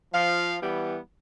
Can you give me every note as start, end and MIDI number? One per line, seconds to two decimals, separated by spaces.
0.14 0.58 53
0.14 0.58 77
0.62 0.99 52
0.62 0.99 55
0.62 0.99 59